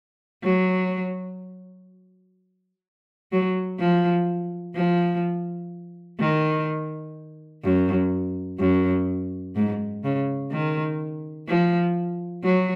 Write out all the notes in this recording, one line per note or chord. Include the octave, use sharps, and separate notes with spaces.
F#3
F#3
F3
F3
D#3
F#2
F#2
G#2
C#3
D#3
F3
F#3